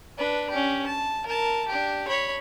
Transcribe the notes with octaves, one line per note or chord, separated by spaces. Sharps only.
D4 B4
C#4 G4
A5
A#4 A5
D4 G4
C#5 B5